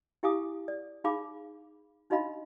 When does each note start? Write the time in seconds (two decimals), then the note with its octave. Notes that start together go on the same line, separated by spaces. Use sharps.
0.23 E4 G4 F5 G#5 D6 D#6
0.68 D5
1.04 D#4 G#4 F5 B5 D6
2.10 D4 D#4 F#4 D#5 F5 B5